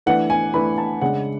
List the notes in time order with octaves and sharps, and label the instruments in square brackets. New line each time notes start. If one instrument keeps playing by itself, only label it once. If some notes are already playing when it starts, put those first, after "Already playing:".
[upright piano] E3 A3 D4 F#5
G#5
E3 A3 D4 B5
A5
C#3 G#3 D4 F#5